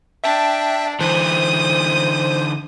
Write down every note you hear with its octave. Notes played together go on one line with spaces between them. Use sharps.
D4 E5 G5 A5
D3 E3 C5 D#6